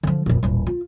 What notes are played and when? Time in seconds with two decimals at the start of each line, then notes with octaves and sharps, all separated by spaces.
0.03 D3 F3
0.26 F1 A#2
0.43 D#1 A1
0.67 F4